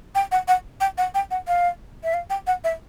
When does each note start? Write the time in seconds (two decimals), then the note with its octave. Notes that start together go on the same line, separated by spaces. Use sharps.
0.15 G5
0.32 F#5
0.48 F#5
0.81 G5
0.98 F#5
1.15 G5
1.31 F#5
1.48 F5
2.04 E5
2.14 F5
2.30 G5
2.47 F#5
2.64 E5